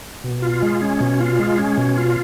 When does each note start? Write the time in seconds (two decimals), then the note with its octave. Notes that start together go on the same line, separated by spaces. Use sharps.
0.24 B2
0.42 F4
0.62 G#3
0.82 C#4
1.00 B2
1.20 F4
1.39 G#3
1.58 C#4
1.78 B2
1.98 F4